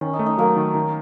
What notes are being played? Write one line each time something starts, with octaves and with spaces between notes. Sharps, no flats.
D#3 C#4
D#4
A3
D#4
F#3 A#3
D#3
D#3